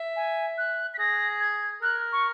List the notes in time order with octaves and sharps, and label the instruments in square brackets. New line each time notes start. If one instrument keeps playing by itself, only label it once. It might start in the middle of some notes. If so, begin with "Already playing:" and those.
Already playing: [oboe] E5
[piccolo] G#5
F#6
B6
[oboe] G#4 [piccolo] A#6
[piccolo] G#6
[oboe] A#4 [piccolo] F#6
[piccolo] C#6